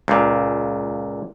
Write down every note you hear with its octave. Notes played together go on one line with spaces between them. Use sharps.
C#2 A#2